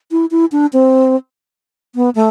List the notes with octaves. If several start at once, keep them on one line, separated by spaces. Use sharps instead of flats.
E4
E4
D4
C4
B3
A3